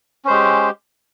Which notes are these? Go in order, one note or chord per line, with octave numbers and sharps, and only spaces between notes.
G#3 C#4 G4 C5